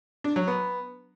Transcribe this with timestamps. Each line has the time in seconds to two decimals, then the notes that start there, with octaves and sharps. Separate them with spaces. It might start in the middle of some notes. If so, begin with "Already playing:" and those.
0.24 D4
0.36 F#3
0.48 B3